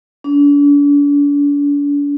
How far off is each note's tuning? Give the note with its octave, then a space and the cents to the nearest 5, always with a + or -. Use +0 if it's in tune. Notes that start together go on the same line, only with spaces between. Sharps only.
D4 -40